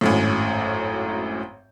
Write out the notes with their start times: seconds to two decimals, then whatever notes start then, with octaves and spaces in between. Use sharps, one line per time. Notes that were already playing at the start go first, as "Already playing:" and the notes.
0.01 G#1 F#2 A2